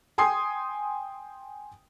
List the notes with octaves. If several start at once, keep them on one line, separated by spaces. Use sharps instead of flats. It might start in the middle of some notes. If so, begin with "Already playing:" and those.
G5 G#5 C6 D#6 C7